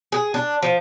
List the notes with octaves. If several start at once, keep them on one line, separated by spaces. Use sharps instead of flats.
G#4
D4
F3